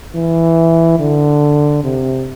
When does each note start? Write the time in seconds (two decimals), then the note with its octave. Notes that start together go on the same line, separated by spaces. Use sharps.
0.15 E3
0.99 D3
1.83 C3